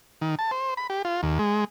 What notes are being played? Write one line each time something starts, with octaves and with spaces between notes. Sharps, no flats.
D#3
A5
C5
B5
G4
F4
D#2
G#3